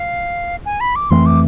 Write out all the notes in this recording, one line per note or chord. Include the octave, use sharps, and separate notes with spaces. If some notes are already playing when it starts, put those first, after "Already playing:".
Already playing: F5
G#5
B5
D6
F2 E3 A3 C4 C6
D6